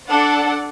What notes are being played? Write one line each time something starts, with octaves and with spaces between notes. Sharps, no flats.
D4 A4 D5 F#5